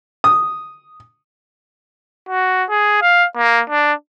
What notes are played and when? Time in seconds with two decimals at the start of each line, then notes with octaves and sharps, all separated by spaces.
0.24 D#6
2.29 F#4
2.70 G#4
3.02 F5
3.37 A#3
3.70 D4